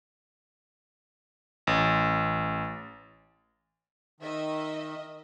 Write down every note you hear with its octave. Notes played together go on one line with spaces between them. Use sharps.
A1
D#3 D#5 E5